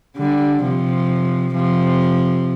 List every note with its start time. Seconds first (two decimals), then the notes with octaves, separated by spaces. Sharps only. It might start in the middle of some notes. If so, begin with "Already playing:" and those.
0.17 D3 G3
0.63 C3 F3
1.54 C3 F3